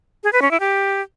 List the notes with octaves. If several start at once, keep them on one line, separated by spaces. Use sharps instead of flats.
G#4
B4
C#4
E4
G4